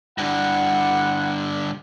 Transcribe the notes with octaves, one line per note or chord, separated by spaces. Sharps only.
G2 D3 E4 F#5